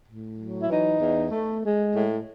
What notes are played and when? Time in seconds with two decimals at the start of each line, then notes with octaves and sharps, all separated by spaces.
0.08 A2
0.39 F#3
0.61 E4
0.70 E3 D#4
1.00 E2
1.31 A3
1.62 G#3
1.93 A2